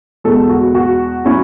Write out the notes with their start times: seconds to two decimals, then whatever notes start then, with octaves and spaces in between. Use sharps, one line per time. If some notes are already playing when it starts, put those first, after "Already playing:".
0.24 E2 B2 G#3 B3 A4
0.49 F#4
0.75 F#4
1.25 F#3 C#4 E4